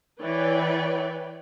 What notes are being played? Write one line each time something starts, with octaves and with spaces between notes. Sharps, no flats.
E3 B4 C#5 D5 G5